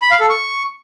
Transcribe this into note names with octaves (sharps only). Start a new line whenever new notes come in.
B5
F5
A4
C#6